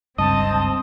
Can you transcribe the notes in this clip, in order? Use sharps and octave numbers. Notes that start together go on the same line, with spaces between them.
F#1 C#2 G2 C4 D#5 A5